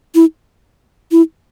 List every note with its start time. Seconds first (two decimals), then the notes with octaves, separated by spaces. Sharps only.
0.15 E4
1.12 E4